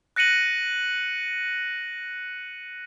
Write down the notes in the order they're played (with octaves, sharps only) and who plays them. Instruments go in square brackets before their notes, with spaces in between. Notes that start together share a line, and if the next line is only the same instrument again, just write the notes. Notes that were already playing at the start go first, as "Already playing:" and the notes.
[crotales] F#6 A#6 C#7 D#7 F#7